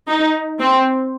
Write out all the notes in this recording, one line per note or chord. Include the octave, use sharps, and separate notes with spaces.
D#4
C4